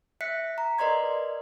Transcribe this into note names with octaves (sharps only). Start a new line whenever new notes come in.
E5 F#6 B6 C#7
A#5
A#4 B4 D5 D#5 C6 G#6